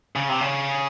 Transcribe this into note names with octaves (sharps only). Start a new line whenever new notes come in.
C#3
C3
C#3